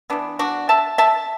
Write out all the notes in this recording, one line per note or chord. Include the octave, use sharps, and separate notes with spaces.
E3 B3 D4
D4 F#4
E5 A5
E5 A5